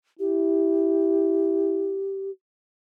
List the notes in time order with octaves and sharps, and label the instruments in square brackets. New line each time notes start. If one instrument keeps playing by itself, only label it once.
[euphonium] E4 [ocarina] G4